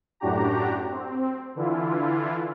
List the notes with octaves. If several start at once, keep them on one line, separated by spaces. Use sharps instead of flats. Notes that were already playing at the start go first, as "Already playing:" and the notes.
F#2 A2 D4 F#4 G4 A#5
C4
D3 E3 E4 F4